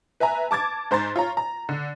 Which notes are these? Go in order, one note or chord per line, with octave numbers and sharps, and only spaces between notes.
B4 E5 G#5 A#5
A5 D6 G#6 A6
G#2 C5 A#5 C6 A6
F4 C#5 A#5
A#5
D3